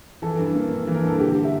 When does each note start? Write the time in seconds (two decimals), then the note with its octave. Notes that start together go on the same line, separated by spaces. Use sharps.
0.22 E3 A4
0.39 G2
0.55 A#3
0.71 G2
0.87 E3
0.94 A#4
1.03 G2 A4
1.20 D3 G4
1.44 E5